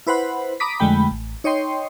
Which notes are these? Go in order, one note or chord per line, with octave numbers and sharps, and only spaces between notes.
E4 B4 C5 F#5 B5
A#5 B5 D6 D#6 B6
F2 D3 G#3 A3 G5 B5
A1
D#4 C#5 D#5 G5 C6